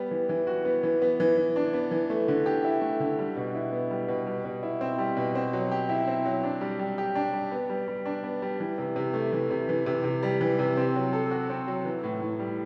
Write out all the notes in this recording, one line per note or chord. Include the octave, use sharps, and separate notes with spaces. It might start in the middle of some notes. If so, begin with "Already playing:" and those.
Already playing: G3 B3
E3
E3
F#4
B3
E3
B3
E3
E3
D4
B3
E3
A3
D3
G4
E4
A3
D3
G3
B2
E4
B3
G3
B2
G3
B2
E4
C4
G3
B2
C4
F#3
G4
E4
C4
F#3
D4
G3
G3
G4
D4
G3
B3
G3
G3
D4
B3
G3
E3
C3
C3
A3
E3
C3
E3
C3
C3
G3
E3
C3
C4
F#3
A4
F#4
C4
F#3
E3
A2
A2
G3